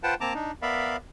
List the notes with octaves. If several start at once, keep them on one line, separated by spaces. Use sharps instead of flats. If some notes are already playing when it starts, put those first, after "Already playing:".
F4 B4 C5 F#5 G5 A5
A#3 C4 A5 A#5 D6
D4 D#4
B3 A#4 D5 E5 F5 B5